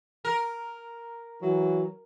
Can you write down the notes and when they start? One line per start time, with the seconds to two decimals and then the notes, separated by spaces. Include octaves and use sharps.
0.25 A#4
1.42 E3 F#3